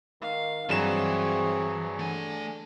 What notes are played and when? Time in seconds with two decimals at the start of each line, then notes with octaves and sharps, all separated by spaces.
0.22 D#3 F5
0.69 G2 E3 F#3 C4 G#4 C#5 E7
1.99 D3 A3 G#5